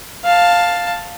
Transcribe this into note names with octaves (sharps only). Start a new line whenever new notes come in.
F5 A5